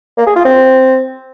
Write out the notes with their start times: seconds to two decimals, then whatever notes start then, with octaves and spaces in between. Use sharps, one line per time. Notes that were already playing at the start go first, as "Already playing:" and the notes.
0.18 A#3
0.27 G#4
0.36 F4
0.45 C4